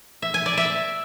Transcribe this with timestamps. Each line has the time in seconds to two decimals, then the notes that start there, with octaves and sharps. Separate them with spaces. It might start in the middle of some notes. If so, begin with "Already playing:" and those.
0.22 E5
0.34 G#5
0.46 D5
0.57 E5